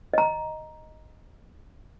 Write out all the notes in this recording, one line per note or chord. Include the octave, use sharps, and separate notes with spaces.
D#5 A#5